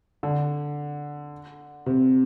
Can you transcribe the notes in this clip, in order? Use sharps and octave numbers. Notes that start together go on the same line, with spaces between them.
D3
C3